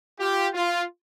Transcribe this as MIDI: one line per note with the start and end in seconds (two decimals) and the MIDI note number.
0.19 0.48 65
0.19 0.48 67
0.54 0.84 65